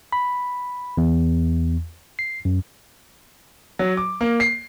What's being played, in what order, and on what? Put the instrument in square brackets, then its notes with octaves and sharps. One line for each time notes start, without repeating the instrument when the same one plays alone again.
[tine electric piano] B5
E2
C7
F#2
[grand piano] F#3
D6
A#3
C7